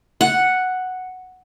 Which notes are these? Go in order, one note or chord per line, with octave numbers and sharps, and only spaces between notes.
F#5